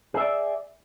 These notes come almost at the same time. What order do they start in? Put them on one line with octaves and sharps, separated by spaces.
G#4 E5 D5